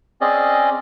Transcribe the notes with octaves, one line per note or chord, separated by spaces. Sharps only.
C4 C#4 G#4 D5 D#5